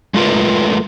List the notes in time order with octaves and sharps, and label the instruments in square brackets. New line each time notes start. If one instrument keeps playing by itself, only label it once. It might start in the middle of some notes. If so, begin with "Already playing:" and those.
[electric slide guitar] G#3 A3 F4 A#4 B4